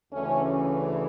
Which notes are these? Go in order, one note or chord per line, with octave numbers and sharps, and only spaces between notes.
D2 C#3 E3 A3 C#4